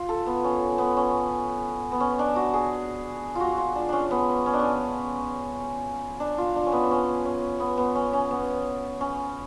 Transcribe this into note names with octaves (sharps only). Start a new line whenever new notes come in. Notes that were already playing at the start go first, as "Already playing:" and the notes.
Already playing: F4
A4
B3
C#4
B3
C#4
B3
C#4
D4
F#4
G#4
F4 F#4
F4
D4
C#4 D4
B3
C#4
D4
C#4
D4
F4
D4
C#4
B3
C#4
C#4
B3
B3
C#4
C#4
B3
C#4